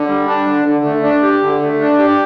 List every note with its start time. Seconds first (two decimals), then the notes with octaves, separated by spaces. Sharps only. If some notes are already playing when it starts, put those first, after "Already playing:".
Already playing: D3
0.08 G3
0.27 D4
0.47 D3
0.65 D3
0.85 A3
1.03 D4
1.23 G4
1.42 D3
1.62 A3
1.81 D4
1.99 G4